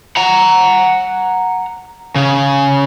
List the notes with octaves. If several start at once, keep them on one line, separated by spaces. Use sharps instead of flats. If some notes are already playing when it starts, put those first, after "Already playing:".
F#5 A#5
C#3 C#4